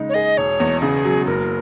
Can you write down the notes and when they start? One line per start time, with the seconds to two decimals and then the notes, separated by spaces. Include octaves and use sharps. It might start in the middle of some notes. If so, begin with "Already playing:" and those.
Already playing: C#3 G#3 D#4
0.09 C#5
0.14 G#4 D#5
0.37 E1 C#5
0.60 E2
0.82 C#3 G#4
1.05 F#3
1.27 F#1 A#4